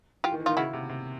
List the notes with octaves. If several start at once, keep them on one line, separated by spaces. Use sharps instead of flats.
E3 F4 G4
D#3
E3
D#3 D#4 F4
C#3 E4 F#4
C3
C3